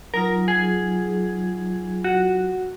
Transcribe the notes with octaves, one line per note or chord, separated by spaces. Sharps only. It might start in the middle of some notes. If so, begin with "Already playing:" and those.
F#3 D#4 F4 A#4
G#4
F#4